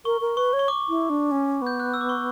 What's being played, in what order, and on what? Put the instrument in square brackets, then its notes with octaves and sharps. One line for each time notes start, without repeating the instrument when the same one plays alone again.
[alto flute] A#4 [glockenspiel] C#6
[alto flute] A#4
[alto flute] B4 [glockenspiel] C#6
[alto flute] C#5
[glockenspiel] C#6
D6
[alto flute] E4
D4
C#4
[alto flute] B3 [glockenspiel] G6
[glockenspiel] F#6
E6
D6
C#6